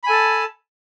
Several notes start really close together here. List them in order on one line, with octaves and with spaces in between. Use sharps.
B5 G#5 A4 A5